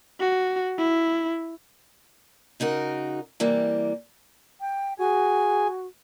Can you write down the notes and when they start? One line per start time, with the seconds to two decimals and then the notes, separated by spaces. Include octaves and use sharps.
0.20 F#4
0.78 E4
2.60 C#3 D#4 F#4 A#4
3.40 C3 E3 G3 A#3
4.61 G5
4.99 F#4 G#4 G#5